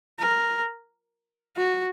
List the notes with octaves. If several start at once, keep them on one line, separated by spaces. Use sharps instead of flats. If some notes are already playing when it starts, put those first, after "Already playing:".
A#4
F#4